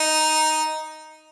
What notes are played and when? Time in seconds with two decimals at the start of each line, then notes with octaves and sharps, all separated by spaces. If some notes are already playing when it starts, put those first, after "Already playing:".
Already playing: D#4